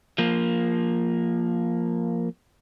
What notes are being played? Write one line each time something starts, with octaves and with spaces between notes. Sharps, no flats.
F3 A#3